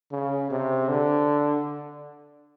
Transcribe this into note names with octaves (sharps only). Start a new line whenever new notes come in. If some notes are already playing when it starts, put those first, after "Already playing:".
C#3
C3
D3